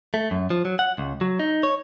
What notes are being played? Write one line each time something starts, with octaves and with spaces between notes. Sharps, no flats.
A3
F#2
F3
F#3
F#5
C#2
F#3
D#4
C#5